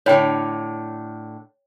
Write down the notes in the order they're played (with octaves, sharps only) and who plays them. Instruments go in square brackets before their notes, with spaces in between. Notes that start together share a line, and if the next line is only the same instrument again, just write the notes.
[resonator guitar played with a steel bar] A2 D3 [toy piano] C#5 G5